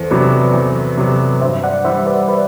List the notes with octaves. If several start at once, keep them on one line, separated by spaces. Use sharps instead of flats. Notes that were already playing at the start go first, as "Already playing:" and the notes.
Already playing: E2 A4 C5
C3 F#3 B3 B4 D5
E2
C3 F#3 B3
G2 C5 E5
D5 F#5
E3 G3 C5 E5
B4 D5
B4 D5